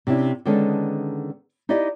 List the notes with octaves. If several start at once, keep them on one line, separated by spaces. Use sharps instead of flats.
C3 C#4 D4 E4
D3 D#3 G#3 B3 C#4 A4
D#4 E4 G4 D5 D#5